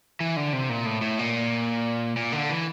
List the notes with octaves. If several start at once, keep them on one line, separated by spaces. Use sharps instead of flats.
E3
D3
C3
A#2
A2
A2
A#2
A#2
D3
E3